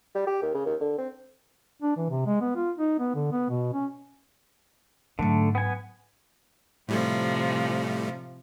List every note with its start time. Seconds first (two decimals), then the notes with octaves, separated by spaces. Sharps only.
0.15 G3
0.27 G4
0.42 D#2
0.55 C#3
0.66 D#2
0.80 D3
0.98 C4
1.82 D4
1.96 E3
2.10 C3
2.26 G#3
2.41 B3
2.56 F4
2.78 D#4
2.99 B3
3.15 D3
3.32 B3
3.50 B2
3.73 C#4
5.19 G#2 D3 F#3 A3
5.55 B3 G#5
6.88 A2 C3 F3 G3 A3